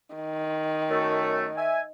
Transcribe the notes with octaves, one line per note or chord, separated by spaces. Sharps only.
D#3
F#2 A3
E5 G#5